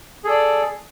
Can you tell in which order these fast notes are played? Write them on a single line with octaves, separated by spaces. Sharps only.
G#4 A4 D5